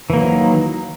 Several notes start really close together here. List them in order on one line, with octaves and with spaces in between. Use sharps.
E3 A#3 F#3 D#3